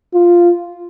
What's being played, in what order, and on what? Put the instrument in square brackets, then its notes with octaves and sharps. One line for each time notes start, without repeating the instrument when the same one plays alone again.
[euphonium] F4